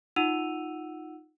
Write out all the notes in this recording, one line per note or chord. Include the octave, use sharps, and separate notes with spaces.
D#4 F4 F#5 E6 D#7 F7